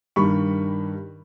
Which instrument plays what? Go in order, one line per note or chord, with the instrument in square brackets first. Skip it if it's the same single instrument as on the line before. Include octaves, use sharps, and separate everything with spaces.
[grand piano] G2 D#3 G3 B5 C#6